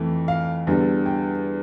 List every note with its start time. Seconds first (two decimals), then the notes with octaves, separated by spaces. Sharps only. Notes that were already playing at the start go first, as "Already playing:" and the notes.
Already playing: F2 E3 A3
0.28 F5
0.67 E2 D3 G3
1.06 G5